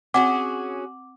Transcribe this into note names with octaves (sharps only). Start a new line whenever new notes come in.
C4 C#4 F#4 G#4 F#5 D6